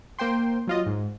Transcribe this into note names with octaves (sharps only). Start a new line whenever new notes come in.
A#3 C5 G5 C6
F#3 F4 D#5
G#2